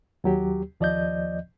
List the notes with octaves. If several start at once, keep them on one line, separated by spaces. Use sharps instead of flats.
D#2 F#3 G4
D#2 F3 D5 D#5 G6